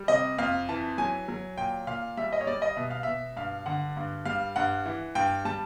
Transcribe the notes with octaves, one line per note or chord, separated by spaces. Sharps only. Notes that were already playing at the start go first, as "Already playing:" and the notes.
Already playing: G3
C3 D#5
F2 F5
E3 A5
F#3 G#5
F#3
A#2 G5
A#2 F5
G3 E5
D#5
C#5
G3 D5
D#5
B2 E5
F5
B2 E5
G2 F5
D3 F#5
G2
G3 F5
G2 F#5
E3
G2 G5
G3 A5